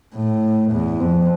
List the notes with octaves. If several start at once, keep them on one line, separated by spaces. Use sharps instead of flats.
A2
E2
F2